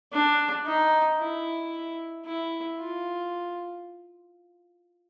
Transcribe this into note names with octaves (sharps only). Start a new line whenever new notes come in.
D4
D#4
E4
E4
F4